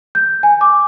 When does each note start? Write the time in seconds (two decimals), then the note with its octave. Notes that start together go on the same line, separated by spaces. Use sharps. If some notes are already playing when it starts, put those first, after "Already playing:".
0.15 G6
0.43 G#5
0.61 D6